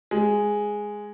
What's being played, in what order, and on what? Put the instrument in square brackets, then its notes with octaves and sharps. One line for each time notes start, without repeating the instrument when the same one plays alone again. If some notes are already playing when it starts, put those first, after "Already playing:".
[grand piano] G#3